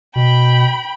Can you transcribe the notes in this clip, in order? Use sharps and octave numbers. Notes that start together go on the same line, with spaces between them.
B2 G5 B5